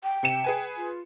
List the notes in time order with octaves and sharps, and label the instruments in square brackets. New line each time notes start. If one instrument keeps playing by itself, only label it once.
[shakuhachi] G5
[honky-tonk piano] C3 C#7 E7
G#4 B4 G#5
[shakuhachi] F4